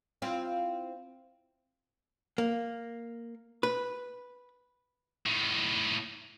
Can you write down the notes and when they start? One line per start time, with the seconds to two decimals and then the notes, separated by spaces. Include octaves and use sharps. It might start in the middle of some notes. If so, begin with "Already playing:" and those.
0.22 C4 E4 F4
2.38 A#3
3.63 B4
5.26 A2 D#3